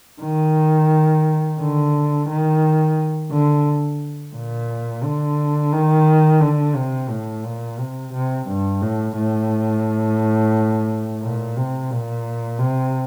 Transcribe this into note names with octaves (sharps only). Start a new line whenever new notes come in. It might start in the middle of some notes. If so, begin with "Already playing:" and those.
D#3
D3
D#3
D3
A#2
D3
D#3
D3
C3
A2
A#2
C3
C3
G2
A2
A2
A#2
C3
A#2
C3